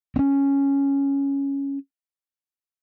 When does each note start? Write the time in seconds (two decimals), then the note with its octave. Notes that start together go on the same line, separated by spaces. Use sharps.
0.16 C4 C#4